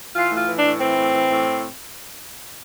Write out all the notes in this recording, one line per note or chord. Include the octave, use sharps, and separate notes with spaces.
E3 F4
A2
F4
E3
D4
A2
E3 C4
A2
E3
A2